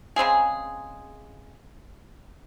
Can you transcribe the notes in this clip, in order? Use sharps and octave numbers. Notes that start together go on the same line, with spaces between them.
C#3 G#3 C4 G#4